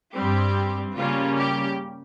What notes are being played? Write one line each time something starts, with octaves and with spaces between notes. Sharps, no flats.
G2 G3 C4 G4
C#3 G3 A#3 C#4 F4
G4